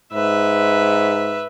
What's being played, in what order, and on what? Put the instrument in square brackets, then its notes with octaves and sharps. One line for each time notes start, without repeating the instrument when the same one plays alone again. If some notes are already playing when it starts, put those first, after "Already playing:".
[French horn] G#2 [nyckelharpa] B4 E5